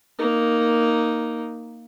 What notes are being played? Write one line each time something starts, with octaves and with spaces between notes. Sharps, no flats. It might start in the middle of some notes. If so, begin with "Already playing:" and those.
A#3 D#4